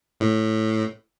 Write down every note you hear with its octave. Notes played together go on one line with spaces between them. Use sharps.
A2